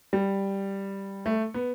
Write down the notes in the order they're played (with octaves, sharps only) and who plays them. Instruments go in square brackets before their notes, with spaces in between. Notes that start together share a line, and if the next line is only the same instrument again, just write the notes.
[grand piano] G3
A3
B3